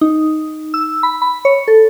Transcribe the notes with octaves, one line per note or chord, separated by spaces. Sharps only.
D#4
E6
B5
B5
C#5
A4